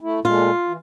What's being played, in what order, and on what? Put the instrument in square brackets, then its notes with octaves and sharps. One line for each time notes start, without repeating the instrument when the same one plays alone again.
[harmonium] A3 E4
[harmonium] A#2 G#3 A3 [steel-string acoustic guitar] F4
[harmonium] E3